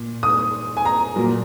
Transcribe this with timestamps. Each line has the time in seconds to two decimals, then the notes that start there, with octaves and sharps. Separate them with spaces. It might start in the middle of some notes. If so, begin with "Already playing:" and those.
Already playing: A#2
0.23 D#6
0.77 G#5
0.86 A#5
1.16 A#2 F#3 A#3